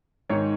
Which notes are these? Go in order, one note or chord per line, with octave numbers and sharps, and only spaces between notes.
G#2 D#3 C#5